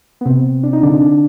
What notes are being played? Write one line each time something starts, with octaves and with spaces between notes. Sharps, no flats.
B3
C3 C4
D4
D#4
D3 D4
D3 D4